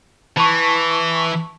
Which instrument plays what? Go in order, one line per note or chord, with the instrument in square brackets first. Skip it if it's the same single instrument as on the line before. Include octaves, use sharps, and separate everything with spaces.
[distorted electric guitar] E3 [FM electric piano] A5 C#6